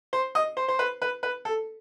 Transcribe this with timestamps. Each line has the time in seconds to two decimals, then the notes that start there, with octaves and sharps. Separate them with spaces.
0.13 C5
0.35 D#5
0.57 C5
0.68 C5
0.79 B4
1.02 B4
1.23 B4
1.45 A4